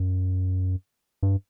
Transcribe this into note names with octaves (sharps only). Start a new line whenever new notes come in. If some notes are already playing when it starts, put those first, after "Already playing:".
Already playing: F#2
G2